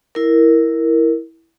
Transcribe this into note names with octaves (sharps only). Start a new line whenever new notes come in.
E4 A#4